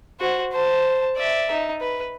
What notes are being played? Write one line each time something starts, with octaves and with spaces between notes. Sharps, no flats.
F#4 C5
C5 A5
D5 E5
D#4
B4